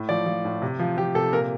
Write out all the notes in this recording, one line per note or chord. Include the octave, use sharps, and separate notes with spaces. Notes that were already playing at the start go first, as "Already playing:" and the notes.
Already playing: A2
F3 D5
F3
A2
C3
F3
F3 G4
C3 A4
A#2 A#4